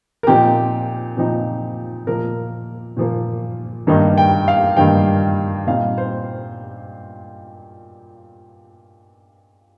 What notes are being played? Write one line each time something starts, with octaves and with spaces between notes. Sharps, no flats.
A#4
A#2 F3 C4 D#4 G4
A#2 F3 C4 D#4
A#2 F3 A#3 A#4
A#2 F3 A#3
G2 D#3 A#3 D#4
G5
F5
G2 D#3 A#3 D#4 G5
A#2 G3 C4 D#4 F5
C5